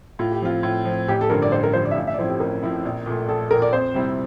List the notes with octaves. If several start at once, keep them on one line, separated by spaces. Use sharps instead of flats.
A2 F4
G4
F3 C4 F4
A2
F3 C4
A1 G4
A4
G2 D3 F3 A#4
D5
A1 C5
A#4
G2 D3 F3 C5
D5
E5
A1 F5
E5
D5
A2 F3 C4 E4 C5
G4
A1 A#4
A2 F3 C4 E4
A#1
A#2 A3
A#1 A4
A#2 A3 A#4
D5
F2 C5
C3 G3 C4 E4